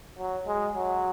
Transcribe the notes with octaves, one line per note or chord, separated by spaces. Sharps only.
F#3
G#3
F#3